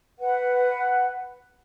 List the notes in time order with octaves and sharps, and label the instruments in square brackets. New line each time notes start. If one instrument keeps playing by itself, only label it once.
[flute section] B4 F#5